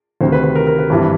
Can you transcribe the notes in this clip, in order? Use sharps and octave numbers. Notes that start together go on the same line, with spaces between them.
D2 C3 D#3 C5
B4
B4
A#4
A#4
B4
G#1 G2 E3